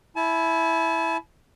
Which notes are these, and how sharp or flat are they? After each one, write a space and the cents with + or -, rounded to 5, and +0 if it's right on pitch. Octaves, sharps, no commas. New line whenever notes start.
E4 +0 A5 -45